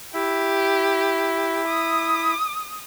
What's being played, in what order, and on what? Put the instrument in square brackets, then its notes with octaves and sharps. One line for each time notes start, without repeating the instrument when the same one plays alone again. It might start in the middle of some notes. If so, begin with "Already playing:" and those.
[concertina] E4 E5 [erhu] G4
[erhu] D#6